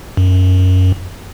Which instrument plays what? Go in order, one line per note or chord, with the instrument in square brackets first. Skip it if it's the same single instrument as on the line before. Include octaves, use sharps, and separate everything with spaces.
[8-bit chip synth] F#2